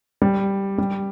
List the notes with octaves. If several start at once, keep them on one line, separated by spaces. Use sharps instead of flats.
G3
G3